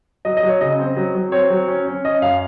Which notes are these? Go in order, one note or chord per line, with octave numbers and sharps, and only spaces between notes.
F#3 D#5
D#5
F#3
C#5
C#3 D#5
C4
F#3
F#3
C4 C#5
F#3
C#4
C#4
C#4 D#5
F#2 F5